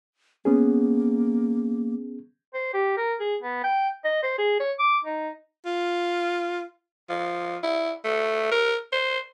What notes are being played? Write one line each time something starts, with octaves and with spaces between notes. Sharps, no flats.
A#3 B3 C#4 G#4
C5
G4
A#4
G#4
B3
G5
D#5
C5
G#4
C#5
D6
D#4
F4
F3
E4
A3
A#4
C5